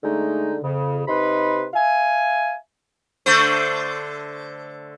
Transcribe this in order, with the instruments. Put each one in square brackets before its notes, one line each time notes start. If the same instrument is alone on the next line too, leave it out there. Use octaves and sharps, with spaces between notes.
[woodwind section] D3 G#3 A3 D#4
F2 C#3
C3 D#4 B4 B5 C6
E5 F5 G#5
[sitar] D3 A3 C5